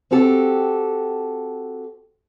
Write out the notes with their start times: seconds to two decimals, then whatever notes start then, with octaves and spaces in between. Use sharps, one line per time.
0.11 C4 F#4 G4 A4